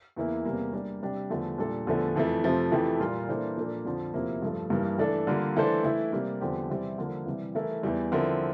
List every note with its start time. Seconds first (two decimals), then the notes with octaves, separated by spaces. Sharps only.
0.16 E2 E3 A#3 E4
0.45 E2 C3 G3 A#3
0.73 G3 A#3 D4
1.02 C3 G3 D4 G4
1.30 E2 D3 F3 A3
1.58 A#2 G3 D4 A4
1.87 E2 D3 F3 A3
2.16 F2 E3 A3
2.43 F2 C3 F3 A3
2.72 F2 E3 A3 E4 G4
3.00 A#2 G3 A#3 F4
3.29 E3 A#3 D4 A4 C5
3.57 A#2 F3 A#3 D4 A4
3.85 F2 D3 F3
4.13 E2 C3 F3 A#3 E4
4.42 G2 F3 A3
4.70 G2 E3 G3 A#3
4.98 E3 A3 D4 A4
5.27 D3 G3 A#3 F4 A#4
5.56 E3 A3 D4 A4 C5
5.84 E3 A3 E4
6.12 C3 G3 A#3
6.41 E2 D3 F3 C4 G4
6.70 C3 E3 G3 C4 E4
6.98 D3 F3 A#3
7.26 C3 E3 G3
7.55 E3 A3 E4 A#4
7.83 E2 E3 G3
8.12 D3 F3 C4 E4 A#4